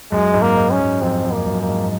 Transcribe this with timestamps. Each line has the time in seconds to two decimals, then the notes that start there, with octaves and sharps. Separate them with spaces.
0.12 F#2 G#3
0.34 G#2
0.42 A#3
0.57 G#2
0.72 C#4
0.79 F#2
1.02 F2 C4
1.24 F2
1.31 A#3
1.47 F#2
1.62 A#3
1.69 G#2